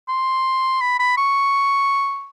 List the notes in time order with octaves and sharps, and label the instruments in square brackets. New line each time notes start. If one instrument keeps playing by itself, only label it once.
[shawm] C6
B5
B5
C#6